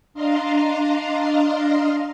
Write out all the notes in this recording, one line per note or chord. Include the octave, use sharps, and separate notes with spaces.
D4 D#5 F5 A#5 C6